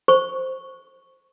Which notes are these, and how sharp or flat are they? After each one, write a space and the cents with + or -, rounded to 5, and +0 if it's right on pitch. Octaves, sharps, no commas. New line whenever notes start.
C5 +0 C#6 +0